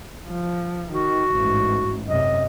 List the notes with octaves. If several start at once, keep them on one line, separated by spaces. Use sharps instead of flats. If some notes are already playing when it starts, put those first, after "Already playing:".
F3
D#3 F#4
A1 G#2
F#2 C3 D#5